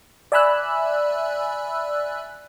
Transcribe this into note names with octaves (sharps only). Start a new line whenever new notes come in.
D5 E5 G#5 B5 E6 F#6